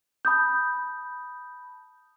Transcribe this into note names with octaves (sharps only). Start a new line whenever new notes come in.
A5 B5 D#6 G6